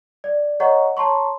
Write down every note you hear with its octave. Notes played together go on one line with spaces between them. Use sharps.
D5
G#4 C#5 D#5 F#5 A#5 C#6
C#5 A5 A#5 C6 C#6